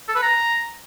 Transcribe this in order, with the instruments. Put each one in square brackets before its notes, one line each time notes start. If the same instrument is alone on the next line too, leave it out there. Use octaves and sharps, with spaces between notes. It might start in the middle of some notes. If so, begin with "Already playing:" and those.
[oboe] A4
B4
A#5